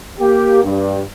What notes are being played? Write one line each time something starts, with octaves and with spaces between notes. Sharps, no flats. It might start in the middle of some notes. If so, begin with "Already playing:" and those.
A#3 G4
G2